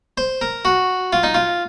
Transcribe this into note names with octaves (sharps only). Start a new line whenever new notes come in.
C5
A#4
F#4
F4
D#4
F4